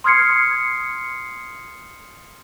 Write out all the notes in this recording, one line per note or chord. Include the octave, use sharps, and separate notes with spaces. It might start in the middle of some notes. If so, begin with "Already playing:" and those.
C6 D#6 F6 G#6 C7 C#7